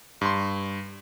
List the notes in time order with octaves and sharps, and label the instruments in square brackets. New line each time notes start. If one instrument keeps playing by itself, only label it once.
[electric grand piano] G2 C6